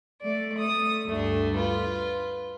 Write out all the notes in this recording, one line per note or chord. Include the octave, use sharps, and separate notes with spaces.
A3 D5
A3 D#6
D2 G2 A3 D4
F4 B4